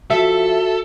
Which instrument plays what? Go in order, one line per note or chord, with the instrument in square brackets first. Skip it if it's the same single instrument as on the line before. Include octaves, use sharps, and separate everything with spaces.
[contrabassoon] F3 [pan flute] F#4 [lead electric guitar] A4 [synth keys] E5